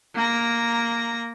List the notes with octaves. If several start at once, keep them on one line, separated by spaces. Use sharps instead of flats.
A#3 A#5